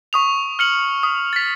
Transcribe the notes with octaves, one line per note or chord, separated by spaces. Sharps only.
C#6 D#6 F7
F6 C#7 F#7
D#6
A6 B6